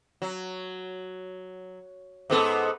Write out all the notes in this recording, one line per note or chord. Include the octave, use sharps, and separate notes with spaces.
F#3
G#2 B3 A4